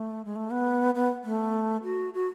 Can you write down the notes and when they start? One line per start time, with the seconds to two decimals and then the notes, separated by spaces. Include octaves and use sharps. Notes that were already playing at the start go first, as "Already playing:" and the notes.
Already playing: A3
0.25 G#3
0.36 A3
0.51 B3
0.95 B3
1.24 A3
1.84 F#4
2.14 F#4